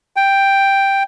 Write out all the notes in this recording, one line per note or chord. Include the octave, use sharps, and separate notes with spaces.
G5